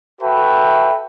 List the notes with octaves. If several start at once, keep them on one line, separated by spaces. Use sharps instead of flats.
F#4 A4 B4 E5 G5